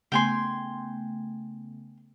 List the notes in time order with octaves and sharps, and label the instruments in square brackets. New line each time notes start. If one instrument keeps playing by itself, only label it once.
[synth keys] C#3 A3 B3 [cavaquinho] G5 G#5 C6